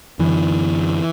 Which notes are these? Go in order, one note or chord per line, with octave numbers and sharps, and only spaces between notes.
F#2 D3 E3